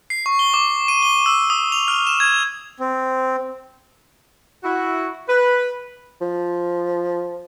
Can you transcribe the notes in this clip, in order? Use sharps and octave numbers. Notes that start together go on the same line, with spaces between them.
C7
C#6
G7
D6
D#7
G7
E6
D#6
F7
F6
E7
G#6
C4
E4 F#4
B4
F3